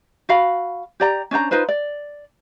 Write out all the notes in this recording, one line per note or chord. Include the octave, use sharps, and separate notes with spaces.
F#4 F5 B5
G4 D5 A#5
C#4 D4 C5 A#5
D#4 F4 B4 C5
D5